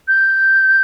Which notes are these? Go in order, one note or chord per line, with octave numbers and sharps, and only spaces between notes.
G6